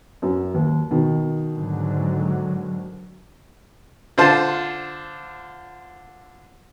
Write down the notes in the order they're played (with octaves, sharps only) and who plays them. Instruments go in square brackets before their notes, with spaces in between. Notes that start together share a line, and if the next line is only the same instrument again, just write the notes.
[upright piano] F#2
D#2
B2 D#3
[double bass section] G#2 D3 F#3
[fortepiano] D3 F4 C5 A5